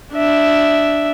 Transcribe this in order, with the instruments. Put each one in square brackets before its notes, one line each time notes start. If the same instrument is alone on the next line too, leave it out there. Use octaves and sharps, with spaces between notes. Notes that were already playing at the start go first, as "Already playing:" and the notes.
[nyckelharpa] D4 E5